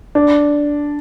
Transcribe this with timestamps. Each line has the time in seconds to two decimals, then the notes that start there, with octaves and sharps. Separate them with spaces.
0.15 D4